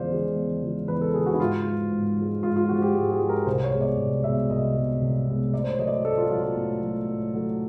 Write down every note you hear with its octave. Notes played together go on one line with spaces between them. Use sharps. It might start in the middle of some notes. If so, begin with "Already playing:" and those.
Already playing: E2 C#3 F3 G#3 C5 D5 F5
C#3 F3 G#3
E2
C#3 F3 G#3
E2 B4
A4
C#3 F3 G#3 G#4
F#4
E4
G#2 F4
F3 G#3
G#2
F3 G#3
G#2 F4
F4
F3 G#3 F#4
G4
G#2 G#4
G#4
F3 G#3
A#4
C2 C5
C#5
B2 G#3
D5
C2
B2 G#3 E5
C2 D#5
B2 G#3
C2
B2 G#3
A2 D5
C5
C#5
F#3 A3 D#5
D5
A2 A4
F4
F#3 A3 F4
F4
A2
F#3 A3
A2
F#3 A3